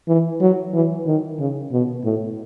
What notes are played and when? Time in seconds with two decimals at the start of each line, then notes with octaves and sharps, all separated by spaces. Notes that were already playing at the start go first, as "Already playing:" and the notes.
0.08 E3
0.41 F#3
0.74 E3
1.07 D#3
1.39 C#3
1.72 B2
2.04 A2